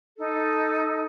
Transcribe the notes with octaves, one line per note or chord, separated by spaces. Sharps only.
D#4 A4